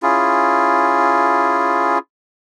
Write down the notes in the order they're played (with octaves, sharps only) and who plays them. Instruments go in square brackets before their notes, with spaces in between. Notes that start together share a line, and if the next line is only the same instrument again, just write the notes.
[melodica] C#4 E4 F4 G#4